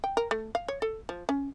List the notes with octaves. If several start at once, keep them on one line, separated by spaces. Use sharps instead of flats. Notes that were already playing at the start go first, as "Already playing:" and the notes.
G5
A#4
A3
F5
C#5
A4
F3
C#4